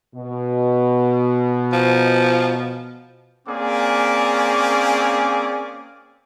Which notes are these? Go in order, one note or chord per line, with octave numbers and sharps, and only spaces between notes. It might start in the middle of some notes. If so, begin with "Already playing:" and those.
B2
F3
A#3 C4 C#4 G#4 D5 D6